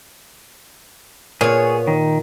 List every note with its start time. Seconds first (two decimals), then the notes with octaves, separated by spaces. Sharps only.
1.41 A#2 B3 G#4 C#5
1.87 D#3